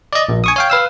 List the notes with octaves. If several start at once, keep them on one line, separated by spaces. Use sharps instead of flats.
D5 D#5
A#1
G#5 C#6 D#6
C#5 F5 G5
B4 F5 E6